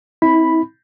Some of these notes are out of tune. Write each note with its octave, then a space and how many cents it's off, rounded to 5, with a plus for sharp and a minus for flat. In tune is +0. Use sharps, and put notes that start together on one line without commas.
C4 +0 E4 -35 B5 +0